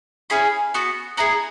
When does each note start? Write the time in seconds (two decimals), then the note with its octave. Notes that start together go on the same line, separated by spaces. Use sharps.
0.30 C#4 E4 G#4 B5
0.74 B3 F#4
1.17 B3 E4 G#4 A#5